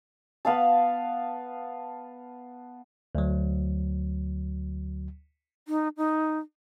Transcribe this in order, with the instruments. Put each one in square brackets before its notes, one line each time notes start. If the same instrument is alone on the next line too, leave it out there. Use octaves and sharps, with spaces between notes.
[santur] B3 F5 A5
[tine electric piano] D2 F#3
[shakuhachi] D#4
D#4